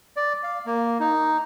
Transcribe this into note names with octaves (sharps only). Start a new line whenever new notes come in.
D5
F5
A#3
D#4